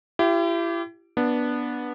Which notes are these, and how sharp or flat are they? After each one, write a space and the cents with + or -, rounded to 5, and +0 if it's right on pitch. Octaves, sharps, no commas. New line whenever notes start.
E4 +40 G4 -10
B3 -15 D4 +0